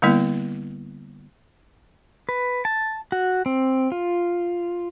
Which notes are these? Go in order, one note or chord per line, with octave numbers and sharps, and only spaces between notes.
D3 G3 A#3 B3 E4
B4
A5
F#4
C4
F4